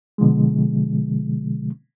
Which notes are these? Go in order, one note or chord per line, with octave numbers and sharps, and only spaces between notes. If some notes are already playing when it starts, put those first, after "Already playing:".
B2 D3 F3 G#3